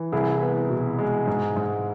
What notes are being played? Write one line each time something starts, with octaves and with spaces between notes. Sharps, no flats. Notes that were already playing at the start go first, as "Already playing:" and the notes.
Already playing: E3
C2 E4 G#4
B3
B2
G#3
G#2
G#2